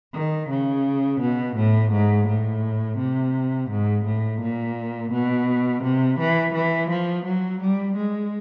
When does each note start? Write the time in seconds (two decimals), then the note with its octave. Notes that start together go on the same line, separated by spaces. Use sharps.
0.14 D#3
0.50 C#3
1.21 B2
1.56 A2
1.92 G#2
2.28 A2
2.98 C3
3.70 G#2
4.05 A2
4.41 A#2
5.12 B2
5.83 C3
6.19 E3
6.54 E3
6.90 F3
7.25 F#3
7.61 G3
7.96 G#3